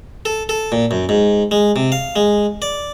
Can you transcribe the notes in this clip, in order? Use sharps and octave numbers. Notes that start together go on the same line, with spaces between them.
A4
A4
A#2
F#2
G#2
G#3
C3
F5
G#3
D5